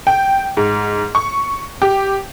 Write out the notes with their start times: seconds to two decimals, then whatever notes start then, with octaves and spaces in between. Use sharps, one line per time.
0.07 G5
0.57 G#2
1.15 C#6
1.82 G4